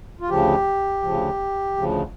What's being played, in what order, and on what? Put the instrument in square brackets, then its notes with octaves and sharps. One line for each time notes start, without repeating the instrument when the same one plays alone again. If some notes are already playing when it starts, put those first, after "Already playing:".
[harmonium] F4
D2 C#3 F3 G4
D2 C#3 F3
D2 C#3 F3